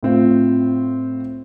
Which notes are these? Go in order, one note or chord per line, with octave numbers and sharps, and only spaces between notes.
A2 C4 F4